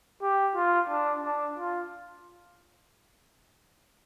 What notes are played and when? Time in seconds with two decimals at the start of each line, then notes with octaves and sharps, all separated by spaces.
0.22 G4
0.55 F4
0.89 D4
1.24 D4
1.58 F4